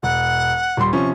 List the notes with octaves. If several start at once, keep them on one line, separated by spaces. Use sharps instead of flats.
E1 F#5
D#1 G3 C6
C3 F3 C#4 C#6